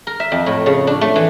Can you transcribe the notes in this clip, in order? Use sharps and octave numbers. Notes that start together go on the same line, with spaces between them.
A#4
E5
F2
A2
C#3
D4
A3
E3